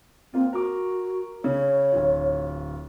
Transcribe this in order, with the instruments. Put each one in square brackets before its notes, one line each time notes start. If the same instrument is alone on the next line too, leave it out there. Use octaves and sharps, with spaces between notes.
[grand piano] A#3 F4 [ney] C4
[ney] F#4 [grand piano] A#4 D6
[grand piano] C#3 [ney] C#5
[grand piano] D1 F4